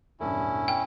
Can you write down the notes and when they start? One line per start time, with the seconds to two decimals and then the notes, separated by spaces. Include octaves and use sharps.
0.20 E1 A1 G2 C#4 E4
0.68 G5